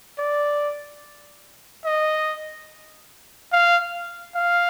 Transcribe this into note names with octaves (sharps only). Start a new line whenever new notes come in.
D5
D#5
F5
F5